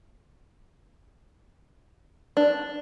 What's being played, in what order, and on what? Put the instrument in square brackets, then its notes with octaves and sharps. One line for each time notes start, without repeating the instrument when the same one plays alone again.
[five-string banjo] D4